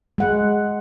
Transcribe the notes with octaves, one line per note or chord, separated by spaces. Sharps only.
G#3 F#5